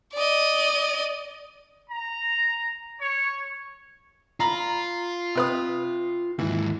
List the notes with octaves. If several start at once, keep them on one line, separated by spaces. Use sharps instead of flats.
D5 D#5
A#5
C#5
F4 A#5 B5
C3 B4 D#6
D#2 G#2 E3